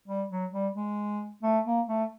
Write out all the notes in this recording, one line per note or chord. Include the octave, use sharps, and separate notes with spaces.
G3
F#3
G3
G#3
A3
A#3
A3